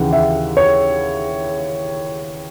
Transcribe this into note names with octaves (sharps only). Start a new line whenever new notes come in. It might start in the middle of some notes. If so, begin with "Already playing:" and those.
Already playing: D#2 C#3 E3 F#5
E5
C#5